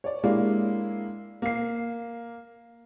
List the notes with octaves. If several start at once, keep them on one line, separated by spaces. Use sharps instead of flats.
C#5 D5
G#3 A#3 D4 E4 G4
A#3 C7